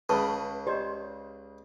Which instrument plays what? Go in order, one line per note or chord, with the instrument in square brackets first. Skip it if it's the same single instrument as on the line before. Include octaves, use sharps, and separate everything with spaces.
[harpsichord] C#2 C#3 [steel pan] B4 [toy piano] A5 C#6
[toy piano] G4 D5 D#5 [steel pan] C5